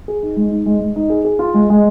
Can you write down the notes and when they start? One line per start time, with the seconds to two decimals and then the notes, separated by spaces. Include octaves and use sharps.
0.08 G#4
0.23 D#4
0.37 G#3
0.51 D#4
0.66 G#3
0.81 G#3
0.96 D#4
1.10 G#4
1.25 G#4
1.39 F4
1.54 G#3
1.70 G#3